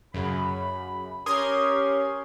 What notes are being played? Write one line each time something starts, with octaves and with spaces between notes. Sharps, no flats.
F#2 C#3 B5
C#4 G4 A#4 C6 D#6 G#6